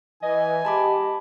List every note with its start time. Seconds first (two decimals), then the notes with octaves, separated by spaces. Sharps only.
0.22 E3 D#5 G#5
0.65 G#3 G4 A5 B5 D6